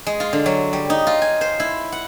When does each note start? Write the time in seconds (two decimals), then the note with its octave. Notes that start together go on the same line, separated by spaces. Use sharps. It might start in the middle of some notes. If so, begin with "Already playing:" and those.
0.07 G#3
0.20 F4
0.33 D3
0.46 F#3
0.73 G3
0.90 D#4
1.07 F4
1.22 G#5
1.41 C5
1.60 E4
1.92 F#5